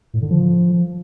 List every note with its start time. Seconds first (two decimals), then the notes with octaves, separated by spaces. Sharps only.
0.14 A2
0.22 D3
0.30 F3